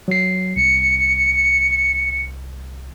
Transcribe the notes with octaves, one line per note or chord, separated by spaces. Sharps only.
F#3 C7
C2 C#7